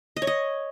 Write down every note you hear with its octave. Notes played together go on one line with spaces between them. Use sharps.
D#5
C#5
D#5